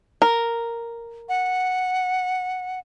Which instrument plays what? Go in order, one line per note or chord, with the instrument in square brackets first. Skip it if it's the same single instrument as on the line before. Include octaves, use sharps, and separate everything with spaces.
[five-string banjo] A#4
[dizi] F#5